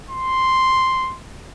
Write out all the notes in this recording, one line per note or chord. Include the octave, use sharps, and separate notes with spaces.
C6